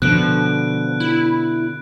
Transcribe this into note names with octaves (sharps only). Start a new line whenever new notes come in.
B2 D3 F3 F#6 D7
E4